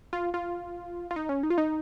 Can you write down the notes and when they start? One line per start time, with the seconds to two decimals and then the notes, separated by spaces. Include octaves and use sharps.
0.13 F4
0.34 F4
1.11 F4
1.16 D#4
1.29 C#4
1.43 D#4
1.50 F4
1.58 D#4